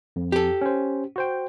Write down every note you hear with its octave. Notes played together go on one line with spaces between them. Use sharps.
F2
G4 A4
C#4 C5
F#4 C5 G5